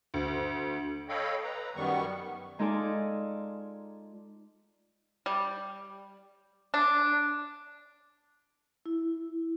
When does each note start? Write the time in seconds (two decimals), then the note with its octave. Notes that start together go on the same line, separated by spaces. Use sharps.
0.14 D2
1.09 A4 C#5 D#5 F5 G5 B5
1.44 B4 A#5
1.76 F#2 D#3 G3 B3 C#6
2.59 G#3 D#4 F4 A4 D5 G#5
5.26 G3
6.74 D4
8.86 E4